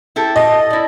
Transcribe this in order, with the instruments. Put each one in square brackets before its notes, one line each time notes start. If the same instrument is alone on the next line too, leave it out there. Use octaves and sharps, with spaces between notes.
[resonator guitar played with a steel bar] E4 G4 A4
[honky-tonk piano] D#5
[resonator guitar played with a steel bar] E4 D5